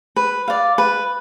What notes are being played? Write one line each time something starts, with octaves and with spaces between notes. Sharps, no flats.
B4
D5 F5
B4